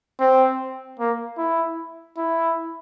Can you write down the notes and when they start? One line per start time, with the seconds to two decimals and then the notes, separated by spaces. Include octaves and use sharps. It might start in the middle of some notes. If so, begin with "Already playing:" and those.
0.20 C4
1.00 A#3
1.38 E4
2.17 E4